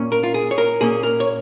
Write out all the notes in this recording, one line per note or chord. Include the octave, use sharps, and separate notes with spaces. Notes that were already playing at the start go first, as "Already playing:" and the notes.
Already playing: A#2 A#3 C#4
A#4
F4
G#4
C#5
A#4
A#2 A#3 C#4 G#4
A#4
C#5